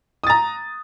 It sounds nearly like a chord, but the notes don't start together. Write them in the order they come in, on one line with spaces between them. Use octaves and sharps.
D#6 A6 A#5